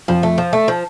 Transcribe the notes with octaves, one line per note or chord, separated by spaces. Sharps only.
F2 F3
A3
F3
A3
F3